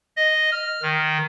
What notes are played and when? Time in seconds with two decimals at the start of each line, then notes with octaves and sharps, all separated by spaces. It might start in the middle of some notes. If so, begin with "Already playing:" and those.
0.17 D#5
0.52 F6
0.82 D#3